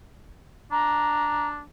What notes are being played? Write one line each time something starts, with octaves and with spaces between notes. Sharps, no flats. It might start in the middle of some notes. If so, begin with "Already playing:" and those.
D4 A#5